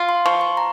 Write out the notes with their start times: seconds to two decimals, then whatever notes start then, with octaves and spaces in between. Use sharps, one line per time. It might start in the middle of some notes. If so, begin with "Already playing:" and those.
Already playing: F4
0.09 C6
0.26 F3 C#6
0.41 C6
0.57 A#5